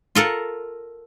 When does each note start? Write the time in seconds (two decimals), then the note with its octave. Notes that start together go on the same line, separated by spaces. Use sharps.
0.15 F4 A4 A#4 F#5